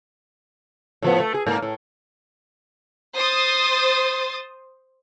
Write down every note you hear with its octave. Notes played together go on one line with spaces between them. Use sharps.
A2 F3 B3
A3
G#4
G#2 A#3
A2
C5 D#6 A6